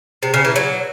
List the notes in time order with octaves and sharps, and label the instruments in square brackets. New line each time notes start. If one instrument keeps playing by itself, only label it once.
[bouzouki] C3
C#3
E3
F#3